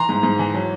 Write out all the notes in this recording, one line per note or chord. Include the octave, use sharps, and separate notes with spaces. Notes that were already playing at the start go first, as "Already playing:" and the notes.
Already playing: E3 A#5 C6
G#2
G#2
E3
F#3